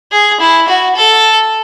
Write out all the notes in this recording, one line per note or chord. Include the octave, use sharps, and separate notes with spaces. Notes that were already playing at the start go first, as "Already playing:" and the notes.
G#4
E4
F#4
A4